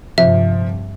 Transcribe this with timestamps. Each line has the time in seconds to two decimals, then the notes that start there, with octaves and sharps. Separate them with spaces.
0.18 G2 C3 F3 E5